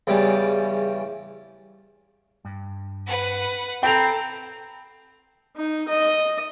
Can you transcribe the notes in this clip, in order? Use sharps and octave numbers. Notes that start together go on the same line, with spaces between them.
E2 C#3 E3 G3 A5
G2
B4 F#5
C4 A4 G5 A#5 B5 F7
D#4
D#5